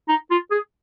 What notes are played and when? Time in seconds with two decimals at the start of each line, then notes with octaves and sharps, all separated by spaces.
0.09 D#4
0.31 F4
0.51 G#4